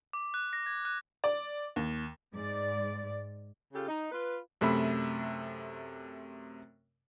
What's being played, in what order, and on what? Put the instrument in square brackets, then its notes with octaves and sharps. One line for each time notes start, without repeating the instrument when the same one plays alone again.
[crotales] D6
F#6
A#6
G#6
F#6
[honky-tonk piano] D5
D#2
[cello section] G#2 D5
[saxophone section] C#3 F4 G4 A4
D#4
F4 B4
[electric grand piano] F#2 C3 A3 E5 B5